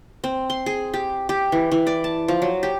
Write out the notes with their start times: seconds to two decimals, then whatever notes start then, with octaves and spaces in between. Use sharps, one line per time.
0.24 C4
0.50 C6
0.66 G#4
0.94 G4
1.29 G4
1.52 E3
1.71 E3
1.87 D5
2.04 A5
2.28 F3
2.42 F#3
2.63 G4